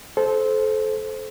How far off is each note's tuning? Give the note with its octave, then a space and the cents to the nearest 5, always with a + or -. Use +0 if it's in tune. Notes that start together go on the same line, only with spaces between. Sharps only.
A4 -25 C5 +0